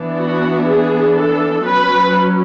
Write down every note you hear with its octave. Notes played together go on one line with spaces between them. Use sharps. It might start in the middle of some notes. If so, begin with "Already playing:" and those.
Already playing: E3 B3 D4
F#4
G#4
A4
F#3 C#4 B4